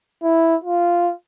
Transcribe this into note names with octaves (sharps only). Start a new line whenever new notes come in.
E4
F4